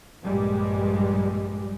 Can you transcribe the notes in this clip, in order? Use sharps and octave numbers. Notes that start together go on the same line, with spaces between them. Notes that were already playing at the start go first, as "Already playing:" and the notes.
A#1 G2 G3 G#3